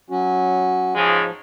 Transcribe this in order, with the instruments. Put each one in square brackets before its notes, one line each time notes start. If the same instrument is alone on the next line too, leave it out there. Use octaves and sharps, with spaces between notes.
[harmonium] F#3 C#4 F#4
[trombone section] G#2 C#3 G#3 [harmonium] F3